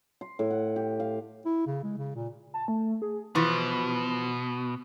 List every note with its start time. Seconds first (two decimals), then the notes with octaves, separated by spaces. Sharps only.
0.21 C6
0.39 A2
0.50 F#5
0.76 G4
1.00 F5
1.45 E4
1.66 C#3
1.84 G#3
1.98 C#3
2.15 A#2
2.54 A5
2.68 A3
3.02 G#4
3.35 B2 E3 F3